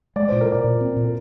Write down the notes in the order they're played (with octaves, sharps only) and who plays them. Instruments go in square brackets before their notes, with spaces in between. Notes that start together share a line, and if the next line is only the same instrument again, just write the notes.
[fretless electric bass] G#3 [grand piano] D5
[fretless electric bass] A#2 [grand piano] C5
[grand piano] A#4
[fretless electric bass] A#2 [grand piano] D5
[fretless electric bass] A#2
C4
A#2
[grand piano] A#4